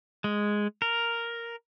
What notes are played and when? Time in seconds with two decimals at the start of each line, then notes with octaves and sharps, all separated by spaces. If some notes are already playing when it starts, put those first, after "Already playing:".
0.24 G#3
0.82 A#4